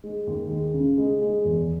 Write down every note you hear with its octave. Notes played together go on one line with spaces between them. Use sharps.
G#3
D#2
G#3
C#3
G#3
G#3
E2